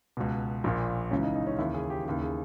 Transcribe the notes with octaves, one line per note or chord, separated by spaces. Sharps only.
C#2 B2
A#1 A#2
C#2 C#3 E3 C#4
D#4
D#4
C#4
D#2 C#3 E3 E4
G#4
G4
D#2 C#3 E3 G4
G#4